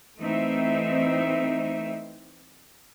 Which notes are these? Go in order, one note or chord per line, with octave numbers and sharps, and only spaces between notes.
E3 A3 C4 D#4 E5